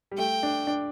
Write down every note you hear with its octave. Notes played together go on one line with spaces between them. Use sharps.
G3
A3 G5
D4
D4